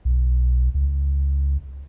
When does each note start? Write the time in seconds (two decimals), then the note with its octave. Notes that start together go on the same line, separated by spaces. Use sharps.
0.05 B1
0.74 C#2